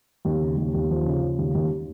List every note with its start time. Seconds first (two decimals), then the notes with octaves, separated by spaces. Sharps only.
0.25 D#2
0.41 C#3
0.57 D#2
0.74 D#2
0.90 F3
1.06 C#3
1.22 C#3
1.38 D#2
1.54 D#2